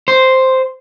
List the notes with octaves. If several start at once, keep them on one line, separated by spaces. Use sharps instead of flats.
C5